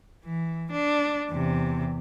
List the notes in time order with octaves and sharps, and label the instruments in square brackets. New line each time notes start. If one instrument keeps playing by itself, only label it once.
[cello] E3
D4
E2 C3